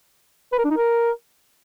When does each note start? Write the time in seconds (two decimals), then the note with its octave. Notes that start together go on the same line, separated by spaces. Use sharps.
0.52 B4
0.58 A#4
0.65 D4
0.71 D#4
0.77 A#4